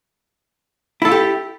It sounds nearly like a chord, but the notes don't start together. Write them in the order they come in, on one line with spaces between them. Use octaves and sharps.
E4 A4 F4 G4